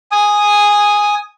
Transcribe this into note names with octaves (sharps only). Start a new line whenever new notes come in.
G#5 D#6